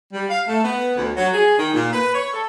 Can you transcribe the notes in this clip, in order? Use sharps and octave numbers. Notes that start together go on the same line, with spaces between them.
G3
F5
A3
B3
D2
F#3
G#4
D#3
A#2
B4
C#5
A4